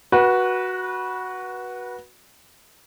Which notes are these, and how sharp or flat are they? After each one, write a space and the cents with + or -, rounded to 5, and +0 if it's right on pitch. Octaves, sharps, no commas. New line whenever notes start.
F#4 +0 B4 -25